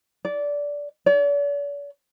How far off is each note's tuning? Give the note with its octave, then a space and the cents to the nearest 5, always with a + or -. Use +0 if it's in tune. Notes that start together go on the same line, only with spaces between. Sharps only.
D5 -15
D5 -45